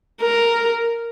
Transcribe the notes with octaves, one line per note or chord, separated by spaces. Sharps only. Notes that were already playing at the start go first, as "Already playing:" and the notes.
A#4